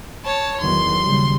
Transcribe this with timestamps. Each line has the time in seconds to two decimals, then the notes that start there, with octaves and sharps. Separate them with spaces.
0.25 C#5 A5
0.61 E2 D#3 F#3 C6
1.02 D#2 C#3 G3